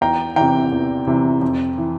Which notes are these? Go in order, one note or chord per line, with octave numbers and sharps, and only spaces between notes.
E2 G5 A#5
C3 E3 G5 A#5
E2
C3 E3
F2
E3